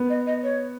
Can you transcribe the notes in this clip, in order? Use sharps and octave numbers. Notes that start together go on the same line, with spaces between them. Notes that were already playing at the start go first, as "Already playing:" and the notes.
Already playing: B3
D#5
D#5
C#5